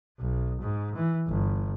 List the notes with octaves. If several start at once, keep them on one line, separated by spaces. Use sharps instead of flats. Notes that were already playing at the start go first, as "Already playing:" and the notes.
B1
G#2
E3
G1